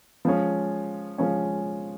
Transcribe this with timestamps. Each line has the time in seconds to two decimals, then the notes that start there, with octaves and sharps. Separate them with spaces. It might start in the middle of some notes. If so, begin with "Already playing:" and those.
0.25 F3 G#3 C#4
1.18 F3 G#3 C#4